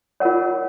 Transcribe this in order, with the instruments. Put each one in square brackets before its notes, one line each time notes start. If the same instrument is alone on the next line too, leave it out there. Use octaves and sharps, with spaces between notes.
[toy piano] F4 A#4 C#5 F#5